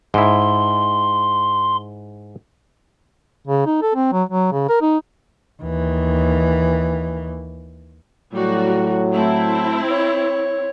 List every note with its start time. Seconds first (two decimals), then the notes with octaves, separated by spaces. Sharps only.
0.14 G#2 E4 C6
3.47 C#3
3.66 D#4
3.82 A4
3.95 C4
4.12 F#3
4.29 F#3
4.52 C#3
4.69 A#4
4.81 D#4
5.62 D#2 E3
8.33 A2 F#3 G3 F#4
9.14 A3 C4 E4
9.89 C#5